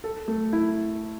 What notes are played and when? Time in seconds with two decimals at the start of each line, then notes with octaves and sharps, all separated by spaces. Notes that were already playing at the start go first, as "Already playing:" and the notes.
0.04 A4
0.28 A3
0.53 E4